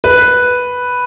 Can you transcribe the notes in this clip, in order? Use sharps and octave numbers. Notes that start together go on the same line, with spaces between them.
B4